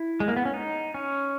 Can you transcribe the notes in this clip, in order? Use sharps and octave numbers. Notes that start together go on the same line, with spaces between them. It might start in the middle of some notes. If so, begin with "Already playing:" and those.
Already playing: E4
G#3
A#3
B3
C#4
D#4
C#4